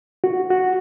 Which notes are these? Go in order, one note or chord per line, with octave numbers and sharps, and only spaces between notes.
F#4
F#4